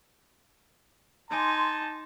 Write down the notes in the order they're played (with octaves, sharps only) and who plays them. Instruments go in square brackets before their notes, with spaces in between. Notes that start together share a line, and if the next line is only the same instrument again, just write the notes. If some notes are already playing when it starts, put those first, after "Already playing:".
[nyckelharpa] D#4 [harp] G#5 D6 G#6 [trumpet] A5 [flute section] C6